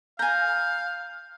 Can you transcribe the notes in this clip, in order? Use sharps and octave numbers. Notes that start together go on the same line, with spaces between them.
F5 G#5 A#5 G6